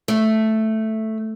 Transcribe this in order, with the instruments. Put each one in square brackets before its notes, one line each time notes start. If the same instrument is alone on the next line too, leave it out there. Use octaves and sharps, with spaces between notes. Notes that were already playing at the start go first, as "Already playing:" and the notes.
[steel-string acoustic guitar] A3